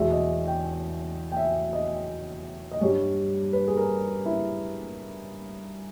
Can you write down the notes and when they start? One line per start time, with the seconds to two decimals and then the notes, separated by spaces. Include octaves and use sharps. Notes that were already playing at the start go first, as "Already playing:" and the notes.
Already playing: E2 B2 G#3 E5
0.10 D#5
0.47 G5
1.32 G5
1.37 E5
1.73 D#5
2.71 D#5
2.81 G2 G3 C#5
3.53 B4
3.68 G#4
3.77 A#4
4.26 E4